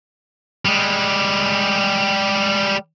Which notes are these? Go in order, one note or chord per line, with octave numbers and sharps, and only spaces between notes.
G3 G#3